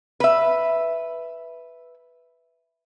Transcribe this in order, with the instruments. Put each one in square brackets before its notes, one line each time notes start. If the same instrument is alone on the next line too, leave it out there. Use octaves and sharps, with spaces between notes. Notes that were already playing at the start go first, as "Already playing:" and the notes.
[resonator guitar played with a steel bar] B4 E5